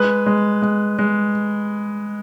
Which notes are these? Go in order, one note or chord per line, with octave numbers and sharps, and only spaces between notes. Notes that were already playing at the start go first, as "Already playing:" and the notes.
Already playing: G#3 B4
G#3
G#3
G#3